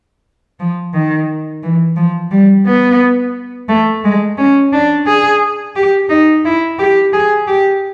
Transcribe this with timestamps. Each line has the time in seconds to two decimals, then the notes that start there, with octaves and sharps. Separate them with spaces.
0.60 F3
0.94 D#3
1.63 E3
1.96 F3
2.31 G3
2.66 B3
3.69 A3
4.04 G#3
4.38 C#4
4.73 D4
5.07 G#4
5.76 G4
6.09 D#4
6.45 E4
6.79 G4
7.13 G#4
7.47 G4